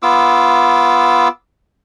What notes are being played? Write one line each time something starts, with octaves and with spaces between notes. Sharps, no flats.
B3 F4 D6 E6